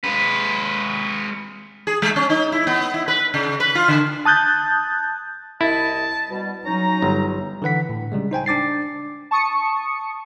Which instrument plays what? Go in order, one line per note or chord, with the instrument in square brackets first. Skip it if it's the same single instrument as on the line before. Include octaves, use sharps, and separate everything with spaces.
[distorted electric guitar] G#3 B4
[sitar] G#4
G#3
C#4
D#4
E4
B3
E4
B4
C#3
B4
F4
D3
[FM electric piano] A5 D#6 F#6 G6 A6
[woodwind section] C2 D#5 [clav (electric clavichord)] E4 [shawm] A5
[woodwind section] B2 G3
[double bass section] F#3 [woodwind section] C#4 D#4 [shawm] A#5
[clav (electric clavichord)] G1
[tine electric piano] D3 E3 B4 F#5 B6
A2
C#3 G3 G#3
D#4 C5 G5 G#5
D4 D6 A6 C7
[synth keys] A5 C#6 D#6 C#7